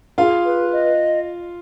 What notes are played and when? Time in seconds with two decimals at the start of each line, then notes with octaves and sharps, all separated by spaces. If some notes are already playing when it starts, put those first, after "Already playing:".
0.17 F4 G#4 F5
0.45 B4
0.71 D#5